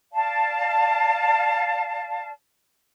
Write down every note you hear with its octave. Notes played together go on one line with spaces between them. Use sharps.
D5 F5 A5